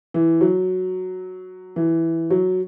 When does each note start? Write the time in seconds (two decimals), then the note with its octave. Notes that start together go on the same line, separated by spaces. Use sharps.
0.14 E3
0.41 F#3
1.76 E3
2.30 F#3